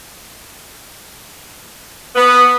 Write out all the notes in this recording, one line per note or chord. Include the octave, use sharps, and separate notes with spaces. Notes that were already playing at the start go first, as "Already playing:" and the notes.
B3